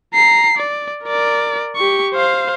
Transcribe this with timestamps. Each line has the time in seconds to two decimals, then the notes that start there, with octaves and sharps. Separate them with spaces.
0.14 A#5 C7
0.58 D5
1.04 A#4 D5
1.76 G4 C#6
2.14 C5 F5